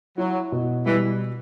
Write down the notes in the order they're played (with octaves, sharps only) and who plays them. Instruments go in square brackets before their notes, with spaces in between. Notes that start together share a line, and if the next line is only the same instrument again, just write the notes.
[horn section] F#3 [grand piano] E4
[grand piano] B2
[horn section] E3 [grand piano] G3